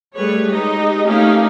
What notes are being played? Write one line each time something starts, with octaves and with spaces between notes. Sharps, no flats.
G3 A3 G#4 B4 C#5
G#3 D#4 G4 D#5
A3 A#3 C#4 D#4 G4 F5